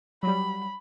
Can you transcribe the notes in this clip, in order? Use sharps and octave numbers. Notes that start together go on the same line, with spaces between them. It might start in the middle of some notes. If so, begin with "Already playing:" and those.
F#3 G3 B5